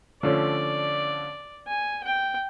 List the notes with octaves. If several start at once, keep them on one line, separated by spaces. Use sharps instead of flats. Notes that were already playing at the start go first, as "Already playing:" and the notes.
D3 F3 A3 C#4 D5
G#5
G5